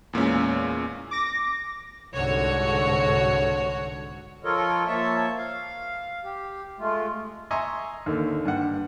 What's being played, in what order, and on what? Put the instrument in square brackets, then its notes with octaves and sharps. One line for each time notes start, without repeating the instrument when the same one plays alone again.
[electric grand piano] E2 A#2 G#3 C#4
[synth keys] D6 A#6
[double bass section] C2 G#2 D3 [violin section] F#4 C#5
[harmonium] F3 F4 A4 A#4 C#5 D#5
F3 A#3 C#5 E5 A5
F5
G4
G#3 A3 F4
[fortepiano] D#5 E5 G#5 A#5 C6 C#6
D#2 D3
G2 F#5